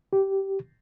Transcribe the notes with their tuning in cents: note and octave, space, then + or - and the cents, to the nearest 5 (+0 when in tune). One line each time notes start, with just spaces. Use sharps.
G4 -10